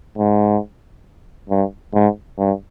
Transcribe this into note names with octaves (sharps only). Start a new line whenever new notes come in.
G#2
G2
G#2
G2